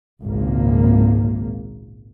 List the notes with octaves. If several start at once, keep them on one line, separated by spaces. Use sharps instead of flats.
G#1 C#2 A#2 A#3